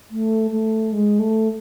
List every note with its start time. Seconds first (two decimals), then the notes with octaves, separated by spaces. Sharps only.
0.11 A3
0.51 A3
0.92 G#3
1.19 A3